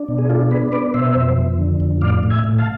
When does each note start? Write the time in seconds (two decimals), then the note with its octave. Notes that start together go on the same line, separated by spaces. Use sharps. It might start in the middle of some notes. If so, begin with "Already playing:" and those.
Already playing: D4
0.08 B2
0.18 G#4
0.29 D4 F4 A4
0.51 B3 G#4 B4
0.72 B3 B4 D5
0.94 B2 C5 E5
1.15 F2
1.37 F2
1.59 D3
1.80 F2
2.01 A2 D5 F5
2.23 A2
2.30 E5 G#5
2.44 A2
2.58 F5 A5